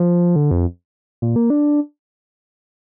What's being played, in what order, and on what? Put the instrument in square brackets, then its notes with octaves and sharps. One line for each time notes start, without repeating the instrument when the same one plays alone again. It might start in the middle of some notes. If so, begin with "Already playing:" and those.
Already playing: [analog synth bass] F3
D3
F2
A#2
A#3
D4